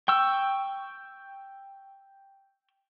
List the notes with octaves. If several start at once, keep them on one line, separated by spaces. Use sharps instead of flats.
G5 C#6 E6